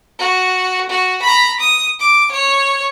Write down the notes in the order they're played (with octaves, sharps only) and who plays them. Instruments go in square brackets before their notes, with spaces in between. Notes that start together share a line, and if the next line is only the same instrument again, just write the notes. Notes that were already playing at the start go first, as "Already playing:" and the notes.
[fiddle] F#4
F#4
A#5 B5
D#6
D6
C#5